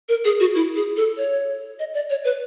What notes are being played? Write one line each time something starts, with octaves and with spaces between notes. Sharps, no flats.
A#4
G#4
F#4
E4
G#4
A4
C#5
D#5
D5
C#5
B4